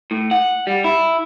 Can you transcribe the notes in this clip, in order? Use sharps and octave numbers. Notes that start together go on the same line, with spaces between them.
A2
F#5
G3
E4